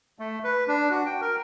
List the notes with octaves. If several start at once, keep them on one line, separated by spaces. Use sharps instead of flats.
A3
B4
D4
F#4
G5
A#4